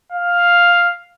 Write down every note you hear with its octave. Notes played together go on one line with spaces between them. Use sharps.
F5